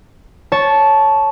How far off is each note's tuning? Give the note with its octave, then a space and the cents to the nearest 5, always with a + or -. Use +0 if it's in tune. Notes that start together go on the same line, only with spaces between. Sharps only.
C#5 +0 A5 -10